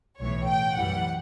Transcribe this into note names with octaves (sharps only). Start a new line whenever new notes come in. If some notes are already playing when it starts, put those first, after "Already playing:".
B1 A2 E3 C#5
G5
F#2 E3 G3 F#5